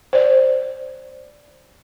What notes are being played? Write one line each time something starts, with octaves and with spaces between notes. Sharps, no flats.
C5 D5